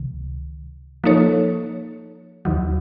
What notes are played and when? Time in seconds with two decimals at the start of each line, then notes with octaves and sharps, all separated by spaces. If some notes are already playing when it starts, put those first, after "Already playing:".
Already playing: C#2 C3 D#3
1.04 F3 A#3 D#4 A4 C#5
2.45 D#2 D#3 F#3